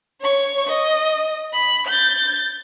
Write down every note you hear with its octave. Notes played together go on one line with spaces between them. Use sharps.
C#5 C#6
D#5
B5
G6 A6